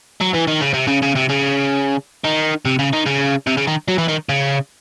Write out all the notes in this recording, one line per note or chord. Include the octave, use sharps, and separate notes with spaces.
F#3
E3
D#3
C#3
C3
C#3
C#3
C3
C#3
D#3
C3
C#3
D#3
C#3
C3
C#3
D#3
F#3
E3
D#3
C#3